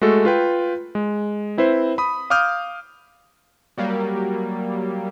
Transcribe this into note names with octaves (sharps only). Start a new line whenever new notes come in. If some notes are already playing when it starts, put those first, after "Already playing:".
G#3 A3 F#4 A4
F4 B4 G5
G#3
C4 E4 B4 C5
B5 D#6
F5 D6 D#6 F6 G6
F#3 G3 A#3